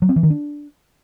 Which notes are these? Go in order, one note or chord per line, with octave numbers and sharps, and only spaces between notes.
F#3
C4
E3
D#3
D4